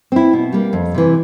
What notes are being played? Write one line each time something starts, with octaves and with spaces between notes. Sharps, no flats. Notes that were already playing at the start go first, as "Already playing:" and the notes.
C4 E4
B2
G3 A#3
F2
C3 E3